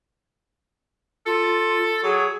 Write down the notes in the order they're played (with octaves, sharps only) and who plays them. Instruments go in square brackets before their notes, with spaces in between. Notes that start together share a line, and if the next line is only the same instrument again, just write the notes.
[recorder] F4 [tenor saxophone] A4
[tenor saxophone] F#3 [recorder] G#4